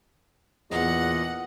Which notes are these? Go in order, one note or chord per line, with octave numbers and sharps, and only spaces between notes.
E2 A#2 D#5 F#5